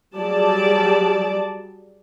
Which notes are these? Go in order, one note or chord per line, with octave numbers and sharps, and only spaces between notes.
F#3 G3 G4 G#4 D5 A5